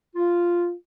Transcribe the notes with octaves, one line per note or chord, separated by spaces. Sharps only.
F4